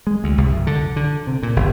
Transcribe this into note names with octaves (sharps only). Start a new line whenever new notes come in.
G#3
D2
C2
F#2
D3
D3
C3
A#2
G1